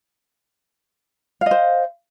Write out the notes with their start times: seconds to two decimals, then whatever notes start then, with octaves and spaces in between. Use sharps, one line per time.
1.41 F5
1.46 D#5
1.51 C5